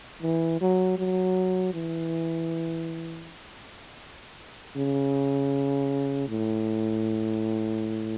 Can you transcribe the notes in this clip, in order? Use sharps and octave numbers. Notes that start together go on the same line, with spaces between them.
E3
F#3
F#3
E3
C#3
A2